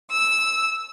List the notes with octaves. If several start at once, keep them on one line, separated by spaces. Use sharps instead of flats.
E6